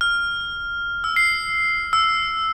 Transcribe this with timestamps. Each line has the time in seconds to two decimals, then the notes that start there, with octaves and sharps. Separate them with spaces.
0.01 F6
1.04 E6
1.16 C7
1.93 E6